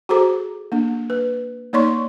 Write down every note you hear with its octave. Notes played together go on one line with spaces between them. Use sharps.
F#4 G#4 A4 C5 A#5 D6
A#3 D4
B4
A#3 D#4 C#5 D5 C6 C#6